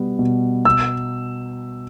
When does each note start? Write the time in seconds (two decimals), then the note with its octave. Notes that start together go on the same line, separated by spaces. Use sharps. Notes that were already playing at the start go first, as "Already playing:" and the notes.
Already playing: B2 G3 B3
0.19 B2
0.65 B2 E6